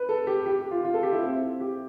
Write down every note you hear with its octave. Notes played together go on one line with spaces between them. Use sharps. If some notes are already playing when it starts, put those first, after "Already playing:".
Already playing: B4
A4
G4
G4
G4
F4
F4
A4
G4
E4
C4
G4